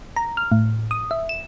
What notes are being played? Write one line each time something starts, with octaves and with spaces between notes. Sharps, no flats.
A#5
F6
A2
D#6
E5
E7